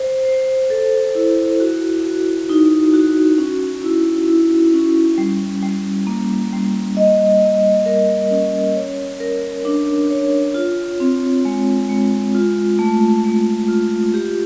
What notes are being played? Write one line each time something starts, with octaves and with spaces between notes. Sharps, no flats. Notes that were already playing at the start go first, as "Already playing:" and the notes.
Already playing: C5
C5
A4
E4
F#4
F#4
D#4
F#4
C#4
E4
E4
C#4
G3
G3
A#3
G3
D#5
D#5
A#4
C#4
C#5
A#4
D4
C#5
F4
C4
G#3
G#3
F4
A3
A3
F4
G4